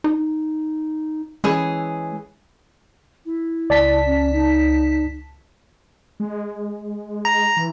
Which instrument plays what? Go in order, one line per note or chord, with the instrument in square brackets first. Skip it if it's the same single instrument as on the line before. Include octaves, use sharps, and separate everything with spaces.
[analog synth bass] D#4
[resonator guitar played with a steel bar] E3 C#4 G#4 [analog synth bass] G#3
[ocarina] E4
[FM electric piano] C#2 A5 B6 [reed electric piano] D5
[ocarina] C#4
D#4
[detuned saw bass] G#3
[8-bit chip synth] A#5
[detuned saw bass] E3